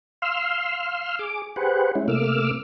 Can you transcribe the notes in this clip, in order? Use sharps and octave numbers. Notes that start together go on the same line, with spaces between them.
F5 C6 E6 F6
G#4 D6
G4 G#4 B4 C5 F#5
G#3 C#4 E4
C3 A3 A#3 D6 E6 F6